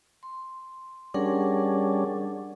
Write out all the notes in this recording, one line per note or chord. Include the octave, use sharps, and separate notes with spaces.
C6
G3 C#4 D4 G#4 A#4 F#5